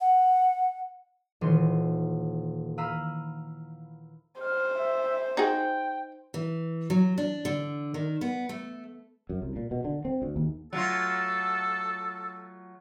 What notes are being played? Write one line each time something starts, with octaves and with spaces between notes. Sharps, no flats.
F#5
D#1 E3 C6 D#7
F5 A#5 B5 E6 D#7
C5 F6
E5
D#4 F#4 G#4 G5
E3
F#3
D4
D3
D#3
B3
A3
F#2
C2
A#2
B2
D3
C4
D2
D#2
F#3 A3 F4 A4